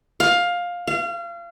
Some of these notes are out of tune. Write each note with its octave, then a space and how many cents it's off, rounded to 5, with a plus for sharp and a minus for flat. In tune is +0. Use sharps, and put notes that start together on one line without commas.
F5 +15
F5 -30